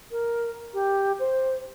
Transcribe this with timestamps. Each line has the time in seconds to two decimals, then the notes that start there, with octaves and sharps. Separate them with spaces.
0.11 A#4
0.74 G4
1.19 C5